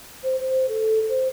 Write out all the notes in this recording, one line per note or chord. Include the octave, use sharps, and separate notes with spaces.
C5
C5
A4
C5